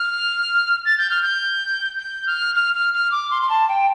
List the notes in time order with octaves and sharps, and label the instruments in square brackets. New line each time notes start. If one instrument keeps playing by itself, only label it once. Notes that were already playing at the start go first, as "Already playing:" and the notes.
Already playing: [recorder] F6
A6
G6
F6
G6
G6
F6
F6
F6
F6
D6
C6
C6
A5
G5